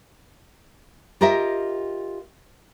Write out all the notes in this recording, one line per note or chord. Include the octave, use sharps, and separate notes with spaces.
F4 G4 A#4 D#5 E5